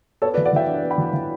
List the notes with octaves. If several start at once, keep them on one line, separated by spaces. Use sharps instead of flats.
B3 A4 C#5
B4 D5
E3
D5 F#5
E3 E5 G5
D4
B3
G5 B5
E3
E3